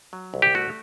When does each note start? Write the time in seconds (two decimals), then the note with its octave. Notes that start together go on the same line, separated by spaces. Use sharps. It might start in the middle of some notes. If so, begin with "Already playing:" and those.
0.13 F#3
0.34 C2
0.42 G4
0.55 A3 F#4